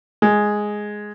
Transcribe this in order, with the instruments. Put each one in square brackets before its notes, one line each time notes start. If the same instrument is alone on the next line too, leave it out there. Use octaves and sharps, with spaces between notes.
[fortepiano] G#3